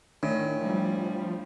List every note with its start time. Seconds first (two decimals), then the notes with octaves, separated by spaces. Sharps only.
0.23 A2 D#3 D4
0.61 F3 G3